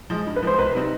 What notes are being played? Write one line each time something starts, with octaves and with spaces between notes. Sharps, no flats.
F3 G#3
G2
B4
F3 G#3 C5
C2 B4
C3 G3 C4 D#4